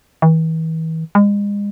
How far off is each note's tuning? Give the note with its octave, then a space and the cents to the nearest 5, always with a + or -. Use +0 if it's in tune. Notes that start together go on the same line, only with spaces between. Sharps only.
E3 -40
G#3 -35